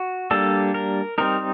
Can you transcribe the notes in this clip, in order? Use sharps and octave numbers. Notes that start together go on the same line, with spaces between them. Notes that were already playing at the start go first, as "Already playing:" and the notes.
Already playing: F#4
G3 A#3 D4 A4
A#4
G3 C4 D#4 A#4